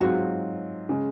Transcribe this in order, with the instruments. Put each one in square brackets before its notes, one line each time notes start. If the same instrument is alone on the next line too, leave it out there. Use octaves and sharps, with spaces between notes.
[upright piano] G#2 F#3 C4 F4 [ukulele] F#4
[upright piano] C#3 G#3